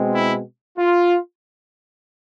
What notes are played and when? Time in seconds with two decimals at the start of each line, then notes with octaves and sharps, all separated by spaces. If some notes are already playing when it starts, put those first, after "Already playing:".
Already playing: B2 G#3 C4
0.14 E4
0.78 F4